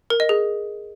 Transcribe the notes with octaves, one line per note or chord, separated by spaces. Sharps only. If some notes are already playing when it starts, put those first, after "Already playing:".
A#4
D#5
G#4